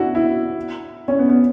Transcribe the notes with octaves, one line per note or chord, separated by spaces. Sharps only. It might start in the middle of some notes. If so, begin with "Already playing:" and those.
Already playing: D4 E4 F#4
E4
C#4
B3
B3